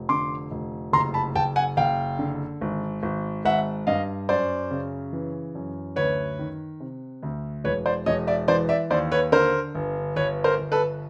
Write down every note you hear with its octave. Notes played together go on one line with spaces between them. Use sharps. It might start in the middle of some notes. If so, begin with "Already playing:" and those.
Already playing: F1
D3 C6 D6
F1
F#1 A#5 C6
A5 B5
F#1 G5 A5
F#5 G#5
F#1 F5 G5
D3
G#1
G#1
G#1 E5 F#5
G2 D#5 F5
F#2 C5 D5
C#3
E3
F#2
D2 B4 C#5
D#3
C3
D2
E1 B4 C#5
C5 D5
E1 C#5 D#5
D5 E5
E3 C5 D5
D5 E5
D#2 C5 D5
B4 C#5
D3 A#4 C5
G1
G1 B4 C#5
A#4 C5
G1
A4 B4